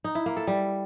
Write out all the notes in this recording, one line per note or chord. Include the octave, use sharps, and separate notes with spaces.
D#4
E4
A#3
A4
G3